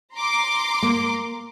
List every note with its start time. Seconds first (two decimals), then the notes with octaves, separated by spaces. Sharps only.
0.15 A#5 C6 D6
0.83 A#3